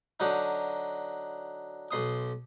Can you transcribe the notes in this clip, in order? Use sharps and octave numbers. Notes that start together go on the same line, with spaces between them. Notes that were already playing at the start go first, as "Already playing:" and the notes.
D3 F#3 D#4
B1 C6 D#6